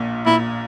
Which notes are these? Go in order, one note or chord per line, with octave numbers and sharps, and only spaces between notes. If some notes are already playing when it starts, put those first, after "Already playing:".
Already playing: A#1 A#2
A#2 E4